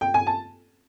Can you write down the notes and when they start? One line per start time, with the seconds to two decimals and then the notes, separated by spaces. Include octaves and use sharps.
0.01 G5
0.14 G#5
0.27 A5